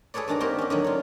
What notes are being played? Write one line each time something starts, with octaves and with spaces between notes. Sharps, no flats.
G#4 A4 B4 C#5 D5
G2 D#3 D4 G#4 A#5
A#3 C4 F#4 G4 A#4
C#4 D#5
D3 D#3 F#3
F4 C#5